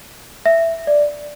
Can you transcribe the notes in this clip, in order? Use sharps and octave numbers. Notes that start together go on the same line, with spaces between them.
E5
D5